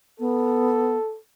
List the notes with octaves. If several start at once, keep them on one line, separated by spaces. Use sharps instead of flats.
B3 A4